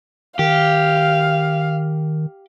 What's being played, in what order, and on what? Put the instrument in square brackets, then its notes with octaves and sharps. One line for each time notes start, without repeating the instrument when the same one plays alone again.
[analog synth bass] D#3 [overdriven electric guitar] G4 [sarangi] F5